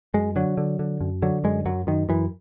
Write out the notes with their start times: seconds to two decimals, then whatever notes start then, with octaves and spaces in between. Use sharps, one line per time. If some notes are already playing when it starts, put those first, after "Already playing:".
0.14 F#2 G#3
0.36 D3 F#3
0.57 D3
0.79 D3
1.01 F#2
1.22 D3 F#3
1.44 F#2 G#3
1.65 F#2 F#3
1.87 F#2 D#3
2.09 F#2 E3